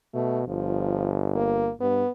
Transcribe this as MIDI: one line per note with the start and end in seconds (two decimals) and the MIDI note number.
0.14 0.43 47
0.14 0.40 57
0.47 1.70 31
0.47 1.17 53
1.35 1.70 58
1.80 2.03 43
1.80 2.10 59